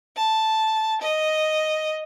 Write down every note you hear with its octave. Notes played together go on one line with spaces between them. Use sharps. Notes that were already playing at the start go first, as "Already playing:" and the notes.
A5
D#5